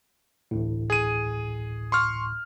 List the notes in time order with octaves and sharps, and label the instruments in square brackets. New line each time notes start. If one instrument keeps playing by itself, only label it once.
[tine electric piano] A1 D2 A2
[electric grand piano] G#4 D#7
C6 C#6 F6